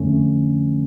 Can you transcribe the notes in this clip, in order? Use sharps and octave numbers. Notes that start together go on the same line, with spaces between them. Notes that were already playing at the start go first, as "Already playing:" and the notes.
Already playing: F2 D3 A3 C#4